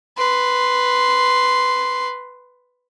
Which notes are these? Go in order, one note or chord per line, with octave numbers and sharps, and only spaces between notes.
B4 C6